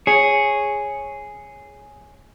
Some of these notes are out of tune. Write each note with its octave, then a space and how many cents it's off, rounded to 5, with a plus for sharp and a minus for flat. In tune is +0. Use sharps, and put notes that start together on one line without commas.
G#4 +0 C#5 +0